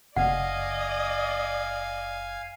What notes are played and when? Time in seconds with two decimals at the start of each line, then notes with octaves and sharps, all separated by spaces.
0.17 F#1 D5 D#5 F5 F#5 G#5